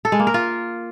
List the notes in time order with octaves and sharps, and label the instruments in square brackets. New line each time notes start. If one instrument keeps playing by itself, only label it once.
[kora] A4
G#3
A#3
A#4
F4